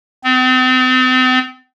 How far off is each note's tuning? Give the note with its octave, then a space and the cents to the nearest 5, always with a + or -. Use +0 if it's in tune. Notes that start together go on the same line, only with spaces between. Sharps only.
C4 -40